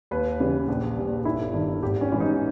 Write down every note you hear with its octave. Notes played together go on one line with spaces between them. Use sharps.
D#2 B4
C#3 E3 G3
A#1
A#2 G3
G1 E4
G2 D#3
G#1 G4
C#4
G#2 E3 G3
D#4